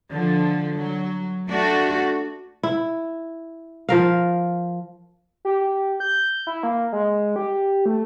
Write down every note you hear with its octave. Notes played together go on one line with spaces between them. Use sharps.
D3 F3
F#3
A3 D4 F#4
E4
F3 A#4 F5
G4
G4
G6
E4
A#3
G#3
G4
A3